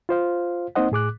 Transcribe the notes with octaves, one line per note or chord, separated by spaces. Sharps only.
F4 C5 F5
A#3 C4 D#4 C5 D#5 F#5
A2 G#4 D6 F#6